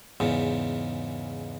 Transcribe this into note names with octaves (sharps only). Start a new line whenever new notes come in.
E2 G#2 C#3